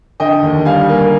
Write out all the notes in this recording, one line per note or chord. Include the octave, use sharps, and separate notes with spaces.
D3 D#5 G5
D#2
G3 F5 G#5
A#3